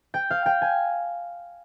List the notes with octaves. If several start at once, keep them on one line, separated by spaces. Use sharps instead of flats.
G5
F5
G5
G#5